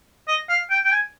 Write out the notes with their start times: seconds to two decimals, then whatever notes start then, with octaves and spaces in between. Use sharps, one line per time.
0.28 D#5
0.49 F5
0.70 G5
0.84 G5
0.91 G#5